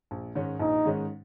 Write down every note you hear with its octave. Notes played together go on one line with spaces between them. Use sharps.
A#1
G#2 D#3 G#3 C#4
A#1 D#4
G#2 D#3 G#3 C#4